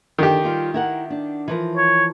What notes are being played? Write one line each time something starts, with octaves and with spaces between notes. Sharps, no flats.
D3 D#3 G4
G3 F4 G5
E4 A#4 F#5
D4
E3 F3 A#4
C#5